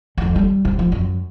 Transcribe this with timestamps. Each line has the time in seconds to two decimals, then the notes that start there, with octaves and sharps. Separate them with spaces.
0.18 F2 D#3
0.36 G3
0.65 C3
0.79 F3
0.92 F#2